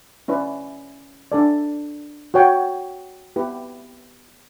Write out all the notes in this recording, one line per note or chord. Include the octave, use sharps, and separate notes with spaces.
C#4 E4 B4 D5
D4 A4 D5
F#4 C#5 G5
B3 E4 G4 B4